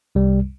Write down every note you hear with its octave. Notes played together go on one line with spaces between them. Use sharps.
C2 C3 G3